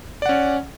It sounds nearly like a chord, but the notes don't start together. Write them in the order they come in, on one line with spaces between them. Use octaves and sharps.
D5 F#5 C#4